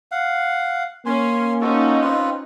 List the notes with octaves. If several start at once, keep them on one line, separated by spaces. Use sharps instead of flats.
F5 F#5
A#3 C#4 G#5 C6
C#4 D#4 F4 F#4 A4
C4 F4 B4